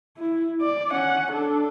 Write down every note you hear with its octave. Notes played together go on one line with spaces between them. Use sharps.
E4
D5
C#4 F#5
D4 A4